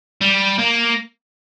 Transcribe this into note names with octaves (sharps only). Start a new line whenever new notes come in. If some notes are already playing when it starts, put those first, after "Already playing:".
G3
A#3